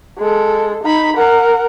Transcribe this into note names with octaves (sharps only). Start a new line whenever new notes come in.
G#3 A4
D#4 B5
A#4 F#5